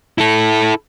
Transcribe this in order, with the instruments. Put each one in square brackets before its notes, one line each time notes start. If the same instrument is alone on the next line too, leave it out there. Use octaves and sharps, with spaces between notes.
[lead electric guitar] E4 A4